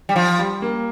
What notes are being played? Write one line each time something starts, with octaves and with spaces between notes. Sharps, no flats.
G3
F3
G3
A#3